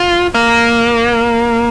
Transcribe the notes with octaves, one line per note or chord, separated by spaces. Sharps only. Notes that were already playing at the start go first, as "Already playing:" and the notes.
Already playing: F4
A#3